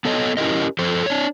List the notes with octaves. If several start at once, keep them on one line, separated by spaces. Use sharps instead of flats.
B3 A4 C#5 D#5
C#4 E4 F#4 G4 A#4 D#5
F3 A4 C5
D4 C#5